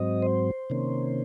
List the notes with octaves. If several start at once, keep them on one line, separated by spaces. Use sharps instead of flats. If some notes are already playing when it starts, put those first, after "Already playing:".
Already playing: G#2 F#3 C4 D#5
C5
C3 D#3 A#3 C#4